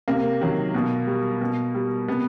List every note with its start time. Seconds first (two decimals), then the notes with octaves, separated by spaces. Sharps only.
0.08 C3 A#3
0.41 D#3 F#3
0.74 B2
1.07 G3
1.41 B2
1.75 G3
2.08 C3 B3